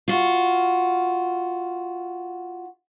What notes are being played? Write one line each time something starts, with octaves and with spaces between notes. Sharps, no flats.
F4 F#4